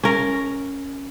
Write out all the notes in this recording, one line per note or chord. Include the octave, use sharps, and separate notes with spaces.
C#4 A#4